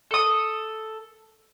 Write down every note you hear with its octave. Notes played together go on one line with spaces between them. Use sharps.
A4 D#6